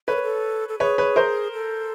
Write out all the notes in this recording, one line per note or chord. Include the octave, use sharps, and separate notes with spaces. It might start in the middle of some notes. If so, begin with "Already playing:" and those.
A4 B4 C#5
A#4
A4
A4
G#4 B4 C#5
B4 C#5
A#4 C5
A4